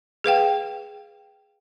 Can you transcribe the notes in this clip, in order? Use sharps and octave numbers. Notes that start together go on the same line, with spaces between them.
G#4 B4 F5 G5